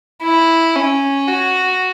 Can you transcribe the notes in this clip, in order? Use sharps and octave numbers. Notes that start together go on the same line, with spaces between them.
E4
C#4
F#4